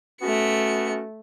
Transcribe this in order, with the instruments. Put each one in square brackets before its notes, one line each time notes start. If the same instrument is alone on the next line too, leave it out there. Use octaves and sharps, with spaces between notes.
[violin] A3 C#7 [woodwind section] B3 C#4 F#4